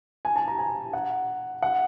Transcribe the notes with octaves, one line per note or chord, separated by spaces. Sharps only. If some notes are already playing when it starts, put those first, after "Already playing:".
G#5
A5
A#5
G#5
F#5
F#5